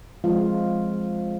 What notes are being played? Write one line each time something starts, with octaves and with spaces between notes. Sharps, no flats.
F3 G#3 C4 F4 F5